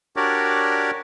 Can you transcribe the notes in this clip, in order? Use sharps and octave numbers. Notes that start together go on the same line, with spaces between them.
D4 F#4 G4 A#4 C#5 D5